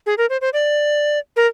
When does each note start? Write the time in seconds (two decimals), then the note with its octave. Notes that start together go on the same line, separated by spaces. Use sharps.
0.06 G#4
0.18 A#4
0.30 C5
0.41 C5
0.53 D5
1.36 A#4